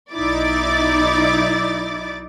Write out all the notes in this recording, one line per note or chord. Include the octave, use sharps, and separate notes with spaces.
B1 D#4 E4 D5 D6 A6